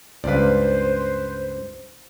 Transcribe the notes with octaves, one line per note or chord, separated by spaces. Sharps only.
C#2 G2 B4 C5 D5 F5